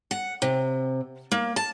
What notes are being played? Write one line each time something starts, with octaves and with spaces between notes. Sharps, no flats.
F#5
C3
A#3
A5